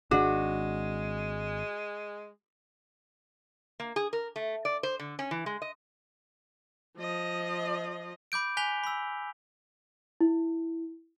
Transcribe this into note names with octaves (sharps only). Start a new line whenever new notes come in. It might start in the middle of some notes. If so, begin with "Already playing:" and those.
G#1 G#3 D4 F#4 G#4 F#5
A#3
G#4
A#4
A3
D5
C5
D3
C#4
E3
G#3
D#5
F3 D#5
B5 D6 G6 D7
G#5 F#6 B6 F7 G7
B5 E6
E4